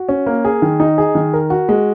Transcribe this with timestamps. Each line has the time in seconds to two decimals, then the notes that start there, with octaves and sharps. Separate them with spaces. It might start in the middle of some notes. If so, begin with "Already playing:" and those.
Already playing: F#4
0.09 C#4
0.26 A#3
0.45 G#4
0.62 D#3
0.80 D#4
0.98 G#4
1.15 D#3
1.33 A#4
1.50 F#4
1.69 G#3